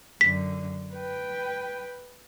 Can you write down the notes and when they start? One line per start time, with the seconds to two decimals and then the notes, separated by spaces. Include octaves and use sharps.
0.21 F#2 D3 B6
0.94 B4 G5